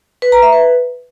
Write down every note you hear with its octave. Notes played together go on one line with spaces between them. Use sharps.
B4
A#5
E5
B4